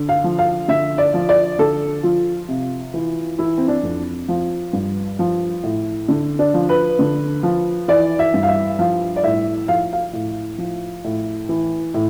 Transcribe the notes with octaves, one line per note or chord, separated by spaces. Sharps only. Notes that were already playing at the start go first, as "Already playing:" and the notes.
Already playing: D3
F5
F3
F5
D3 E5
D5
F3
D5
D3 A4
F3 F4
C3
E3
E3 E4
C4
D4
F2
F3
G2
F3
A2
D3
D4
F3
B4
D3
F3
E3 D5
E5
G2
F5
E5
F3 F5
D5
A2 E5
F3 F5
F5
A2
F3
A2
E3
A2